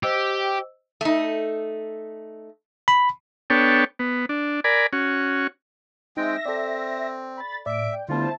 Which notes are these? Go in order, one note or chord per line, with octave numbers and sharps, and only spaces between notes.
G4 C5 D#5 E6
A3 D#4
B5
B3 D4 A4 C#5 G5
B3
D4
A#4 D5 G#5 B5
C#4 F#4
G#3 C4 D#4 E5 G5 A#6
C4 A4 D5
B5 A6
A2 D5 E5 D7
G5
D3 G3 A3 B3 E4 F4 C5 A5